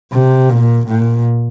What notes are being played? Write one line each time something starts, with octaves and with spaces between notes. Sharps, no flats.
C3
A#2
A#2